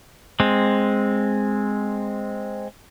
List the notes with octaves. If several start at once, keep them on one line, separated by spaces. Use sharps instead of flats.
G#3 C4